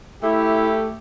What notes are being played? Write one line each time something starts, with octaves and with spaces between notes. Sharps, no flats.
A3 E4 G4